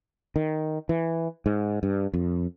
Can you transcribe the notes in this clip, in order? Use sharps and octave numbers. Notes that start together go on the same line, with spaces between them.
D#3
E3
G#2
G2
F2